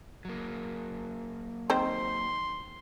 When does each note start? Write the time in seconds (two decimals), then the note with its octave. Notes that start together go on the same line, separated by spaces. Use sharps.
0.25 F#3 A#3
1.70 D#3 C4 C5 C6